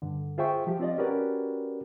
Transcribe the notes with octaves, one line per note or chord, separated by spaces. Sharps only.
G2 D3
F4 G#4 C5 E5 G5 C#6
F3 G4
C4 F4 D5 D#5
C#4 F#4 G4 A#4 B4 D5